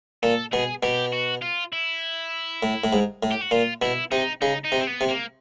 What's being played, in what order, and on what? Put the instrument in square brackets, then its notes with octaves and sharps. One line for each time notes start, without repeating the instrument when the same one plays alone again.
[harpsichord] A#2 [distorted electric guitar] A4
[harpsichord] B2 [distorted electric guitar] G#4
[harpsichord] B2 [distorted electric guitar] G4
[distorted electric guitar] F#4
F4
E4
[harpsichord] A2
A2
G#2
A2
[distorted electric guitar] G4
F#4
[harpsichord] A#2 [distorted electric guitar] F4
[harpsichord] B2 [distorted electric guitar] E4
[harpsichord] C3 [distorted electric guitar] D#4
[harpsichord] C#3 [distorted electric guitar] D#4
[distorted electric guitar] D#4
[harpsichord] C3
[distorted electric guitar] C4
B3
[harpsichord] C3
[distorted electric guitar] A#3